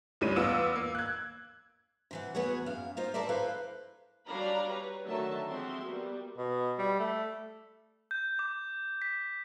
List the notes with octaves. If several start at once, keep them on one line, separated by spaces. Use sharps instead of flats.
C#2 A2 G3 C#4 D#7
E2 B3 F4 E6 D7 E7
A#3
F#6 G#6
C3 E3 F#5
E2 B3 F#4 G#4 C#5
F#2 F5
D#4 F4 C5
A4 A#4 C5 D5 E5
E4 A4 B4 C5 F5
F#3 G3 D4 F5 A#5 B5
B4 C#5
D3 D#3 F#3 A3 E5 A5
F3 G#3 C4 F#4 E5 C6
G3 A#3 B3 F#4
B2
G3
A3
G6
D6
B6